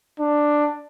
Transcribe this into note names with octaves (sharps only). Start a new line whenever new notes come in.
D4